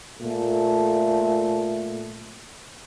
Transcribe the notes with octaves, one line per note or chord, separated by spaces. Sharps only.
A#2 A3